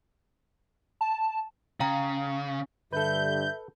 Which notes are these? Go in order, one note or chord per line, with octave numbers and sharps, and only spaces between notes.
A5
C#3 F5 G5 A#5
G2 D3 A4 B4 E5 G6